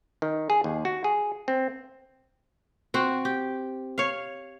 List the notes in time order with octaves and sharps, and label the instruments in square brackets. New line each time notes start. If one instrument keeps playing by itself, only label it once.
[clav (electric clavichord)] D#3
G#4
D#2
F#4
G#4
C4
[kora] C4 F#4
G4
C#5 F5